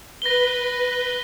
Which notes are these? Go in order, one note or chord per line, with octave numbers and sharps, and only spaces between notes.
B4 A#6 G7